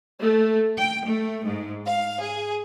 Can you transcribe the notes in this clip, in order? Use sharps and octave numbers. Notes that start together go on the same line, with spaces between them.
A3
G5
A3
G#2
F5
G#4